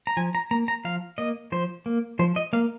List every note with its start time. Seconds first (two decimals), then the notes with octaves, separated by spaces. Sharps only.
0.07 A#5
0.17 F3 G#5
0.35 A#5
0.51 A#3 A#5
0.68 A#5
0.85 F3 F5
1.18 A#3 D#5
1.52 F3 C5
1.86 A#3
2.19 F3 C5
2.36 D#5
2.53 A#3 F5